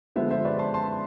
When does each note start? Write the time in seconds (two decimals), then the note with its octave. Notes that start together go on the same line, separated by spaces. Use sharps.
0.16 D3 F3 G#3 B3 C5 E5
0.30 C5 E5
0.45 B4 D5
0.59 A5 C6
0.74 A5 C6